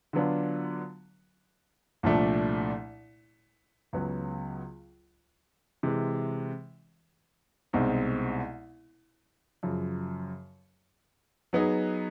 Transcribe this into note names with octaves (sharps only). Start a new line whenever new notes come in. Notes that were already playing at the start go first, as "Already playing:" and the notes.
D3 F#3 B3 D4 F4
C2 A#2 F3 A3 D4
C#2 C#3 F#3 B3
C3 E3 G#3
C2 B2 G#3 C4 D#4
F#2 C#3 F3
F#3 B3 D#4 G#4